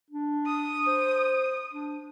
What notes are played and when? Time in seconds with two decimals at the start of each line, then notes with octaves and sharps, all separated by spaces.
0.10 D4
0.47 D#6
0.87 C5
1.72 D4